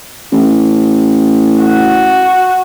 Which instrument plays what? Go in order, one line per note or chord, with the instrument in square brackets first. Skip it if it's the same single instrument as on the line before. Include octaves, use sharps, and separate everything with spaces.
[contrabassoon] A1
[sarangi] F#4